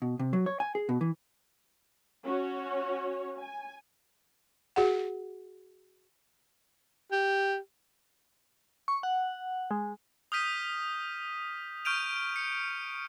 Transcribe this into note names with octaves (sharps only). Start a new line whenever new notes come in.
B2
C3
F#3
C#5
G#5
G#4
B2
E3
C#4 F#4 C#5
G#5
F#4 G#4 F#5
G4
C#6
F#5
G#3
D#6 F6 G6 B6 D#7
C#6 F6 G6 D7 D#7 F7
C#7